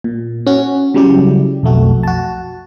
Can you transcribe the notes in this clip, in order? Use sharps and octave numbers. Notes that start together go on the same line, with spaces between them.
A#2
C#4 F#4
C#3 F#3 G3 E4 G4
B1 F2 A3 F#4
F#4 A5